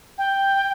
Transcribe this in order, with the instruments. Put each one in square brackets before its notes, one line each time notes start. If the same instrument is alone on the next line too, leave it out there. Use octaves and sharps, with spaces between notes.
[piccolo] G5